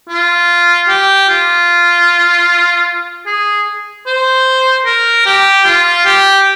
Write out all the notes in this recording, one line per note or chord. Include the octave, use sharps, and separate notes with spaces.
F4
G4
F4
G#4
C5
A#4
G4
F4
G4